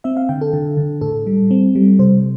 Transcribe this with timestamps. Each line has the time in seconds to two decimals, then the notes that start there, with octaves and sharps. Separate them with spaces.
0.04 C4 E5
0.17 F5
0.29 D3 G5
0.41 A4
0.53 D3
0.77 D3
1.01 A2 A4
1.27 G3
1.51 C4
1.75 G3
1.99 C3 C5